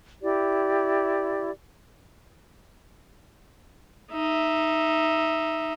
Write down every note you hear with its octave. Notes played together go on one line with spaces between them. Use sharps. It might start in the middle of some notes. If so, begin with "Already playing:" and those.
E4 G4 D5
D#4 E5